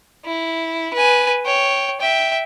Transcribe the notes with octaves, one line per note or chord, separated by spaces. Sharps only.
E4
B4 G#5
C#5 G5
E5 G5